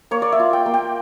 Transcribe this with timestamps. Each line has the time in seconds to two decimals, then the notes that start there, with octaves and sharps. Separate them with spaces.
0.11 A#3 C#5
0.22 D5
0.32 E5
0.39 F4
0.53 G5
0.66 A#3
0.74 G5